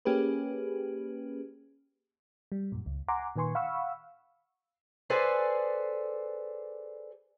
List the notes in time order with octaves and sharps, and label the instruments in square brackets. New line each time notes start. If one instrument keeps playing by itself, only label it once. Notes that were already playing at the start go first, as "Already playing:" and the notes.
[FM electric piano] A#3 C#4 G4 G#4 B4
G3
F#2 A#2
C#2
F#5 G#5 A#5 C6 D6
A#2 D#3 B4 G#5 C6 C#6
F5 F#5 B5 C#6 E6
[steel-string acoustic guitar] G#4 A4 B4 C5 D5 G#5